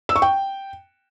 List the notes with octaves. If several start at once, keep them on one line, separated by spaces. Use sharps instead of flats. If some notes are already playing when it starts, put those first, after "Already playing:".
E6
C#6
G5